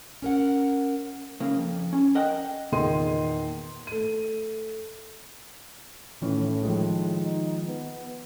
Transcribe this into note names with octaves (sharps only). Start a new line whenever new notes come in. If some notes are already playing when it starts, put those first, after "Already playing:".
C#4 A#4 F#5
C#3 A#3
F2
C#4
A#4 D#5 F#5 G5
E2 A#2 D#3 G#4 C6 D#7
A3 D#7
A2 D#3 E3 C#4
D#3 F3 G#3
D#4
B3